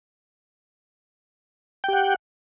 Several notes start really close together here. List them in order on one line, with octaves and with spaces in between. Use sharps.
G5 G4 F#5